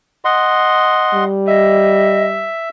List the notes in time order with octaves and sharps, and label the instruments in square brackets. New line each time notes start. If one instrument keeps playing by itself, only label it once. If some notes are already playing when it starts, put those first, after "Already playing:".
[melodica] D#5 F#5 C6
[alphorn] G3
[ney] D#5 [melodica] E5